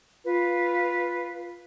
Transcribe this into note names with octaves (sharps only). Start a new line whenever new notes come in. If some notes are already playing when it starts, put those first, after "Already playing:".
F4 B4